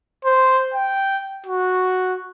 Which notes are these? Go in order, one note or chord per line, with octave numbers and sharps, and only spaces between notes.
C5
G5
F#4